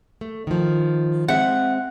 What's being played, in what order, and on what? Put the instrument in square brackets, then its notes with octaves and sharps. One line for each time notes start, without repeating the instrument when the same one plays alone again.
[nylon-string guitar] A3
D#3 F3
[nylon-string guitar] G#3 C4 E5 [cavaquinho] F#5